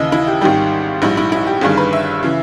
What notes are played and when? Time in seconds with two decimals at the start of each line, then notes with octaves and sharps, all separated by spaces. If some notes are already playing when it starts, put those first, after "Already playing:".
Already playing: D#2 C#3 E3 D#5 E5
0.12 E4
0.27 G4
0.41 G#1 G#2 D#3 G3 G4
1.02 A#1 G#2 G3 E4
1.17 E4
1.32 E4
1.47 G4
1.61 G1 G2 D#3 G3 G#4
1.77 B4
1.93 E5
2.23 C#3 E3